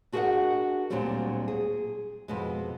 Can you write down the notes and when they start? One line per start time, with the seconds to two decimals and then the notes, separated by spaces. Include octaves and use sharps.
0.12 D4 F#4 G#4 A#4 D#5 F#5
0.90 D2 A#2 D3 F#3 G3 C4
1.48 G#4
2.28 F2 B2 G#3